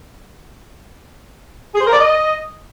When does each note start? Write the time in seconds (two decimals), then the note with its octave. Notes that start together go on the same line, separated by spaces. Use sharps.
1.75 G#4
1.81 C5
1.87 A#4
1.93 D5
1.99 D#5